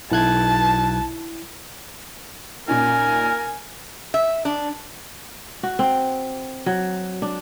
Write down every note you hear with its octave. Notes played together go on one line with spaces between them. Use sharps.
B1 E4 A5 F#6 G#6
A#2 C#4 D#4 A#4 G#5
E5
D4
F#4
C4
F#3
D4